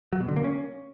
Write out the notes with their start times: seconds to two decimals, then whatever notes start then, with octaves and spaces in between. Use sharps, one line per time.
0.13 F#3
0.20 B2
0.28 D3
0.36 A#3
0.44 C#4